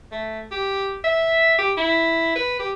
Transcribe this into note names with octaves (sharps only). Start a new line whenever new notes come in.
A3
G4
E5
G4
E4
B4
G4